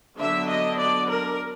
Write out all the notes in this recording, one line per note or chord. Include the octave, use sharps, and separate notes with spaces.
D3 F#3 B3 D4 E5
D#5
D5
A#4